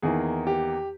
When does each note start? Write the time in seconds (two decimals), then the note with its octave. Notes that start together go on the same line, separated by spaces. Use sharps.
0.02 E2 D#3 A#3 G#4
0.47 G4